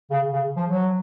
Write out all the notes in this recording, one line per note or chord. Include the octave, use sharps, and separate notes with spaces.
C#3
C#3
F3
F#3